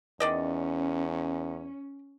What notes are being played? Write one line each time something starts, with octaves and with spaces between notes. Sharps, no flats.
E2 D#3 C#4 D5 D#5